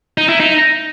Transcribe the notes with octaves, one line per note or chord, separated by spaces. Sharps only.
D#4
E4
D#4